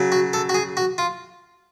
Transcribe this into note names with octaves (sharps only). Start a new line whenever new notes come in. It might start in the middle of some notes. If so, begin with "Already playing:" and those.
Already playing: C#3 F#3
F#4
A4
F#4
G#4
F#4
F4